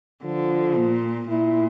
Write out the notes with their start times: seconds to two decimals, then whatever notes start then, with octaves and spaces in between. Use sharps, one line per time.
0.24 D3 F3
0.77 A#2
1.28 A#2 E4